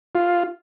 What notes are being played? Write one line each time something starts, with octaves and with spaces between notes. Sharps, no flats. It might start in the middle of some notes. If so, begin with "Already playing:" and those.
F4